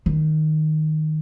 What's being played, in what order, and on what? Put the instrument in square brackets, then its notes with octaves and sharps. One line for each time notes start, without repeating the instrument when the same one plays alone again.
[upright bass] D#3